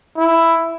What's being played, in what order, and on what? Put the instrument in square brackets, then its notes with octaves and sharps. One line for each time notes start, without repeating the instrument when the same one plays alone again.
[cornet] E4